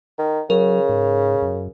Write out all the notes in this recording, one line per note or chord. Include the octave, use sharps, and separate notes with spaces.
D#3
C#3 F#3 A#4
G#2
F#2